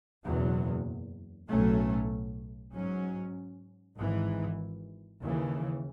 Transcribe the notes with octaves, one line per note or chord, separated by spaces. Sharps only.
F#1 E2 B2 F#3
B1 A2 F#3 A3 C#4
G#2 F#3 C#4
G#1 G#2 E3
D#2 C#3 E3